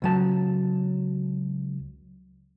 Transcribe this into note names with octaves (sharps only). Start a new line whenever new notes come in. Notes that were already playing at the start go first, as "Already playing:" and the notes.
C#2 F#3 A5